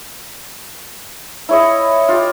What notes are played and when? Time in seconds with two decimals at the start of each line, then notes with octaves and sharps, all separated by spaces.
1.49 E4 C#5 D#5
2.08 F4 G4